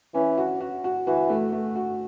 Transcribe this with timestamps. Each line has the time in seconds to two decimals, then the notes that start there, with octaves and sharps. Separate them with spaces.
0.14 E3 C#4
0.38 F#4
0.60 F#4
0.84 F#4
1.07 E3 F#4
1.30 A3
1.52 A3
1.76 F#4